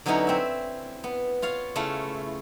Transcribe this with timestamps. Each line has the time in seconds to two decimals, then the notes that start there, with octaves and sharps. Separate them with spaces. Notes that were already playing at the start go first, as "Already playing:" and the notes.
0.06 D3 F#3 B3 C#4 D#4 E4
0.27 C4 E5
1.04 B3
1.42 F4 C#5 F5
1.76 C#3 A3 E4 F4